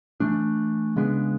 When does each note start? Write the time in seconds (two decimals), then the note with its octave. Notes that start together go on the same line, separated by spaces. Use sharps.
0.20 E3 A3 D4
0.96 C#3 G#3 B3 D4